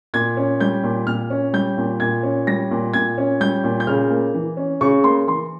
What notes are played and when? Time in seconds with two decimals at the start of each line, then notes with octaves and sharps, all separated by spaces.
0.14 A#2 G#6
0.37 C#4
0.60 G3 G6
0.83 A#2
1.07 A#2 F6
1.30 C#4
1.53 G3 G6
1.78 A#2
2.00 A#2 G#6
2.23 C#4
2.47 G3 A#6
2.71 A#2
2.94 A#2 G#6
3.18 C#4
3.41 G3 G6
3.64 A#2
3.80 G6
3.87 C#3 F6
4.10 A#3
4.34 E3
4.57 C#4
4.81 C#3 C#6
5.03 A#3 C6
5.27 E3 C6